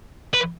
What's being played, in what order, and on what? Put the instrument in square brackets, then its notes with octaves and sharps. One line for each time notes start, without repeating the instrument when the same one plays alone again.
[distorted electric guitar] B4